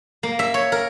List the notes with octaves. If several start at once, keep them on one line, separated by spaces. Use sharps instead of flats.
A#3
E5
C#5
A#4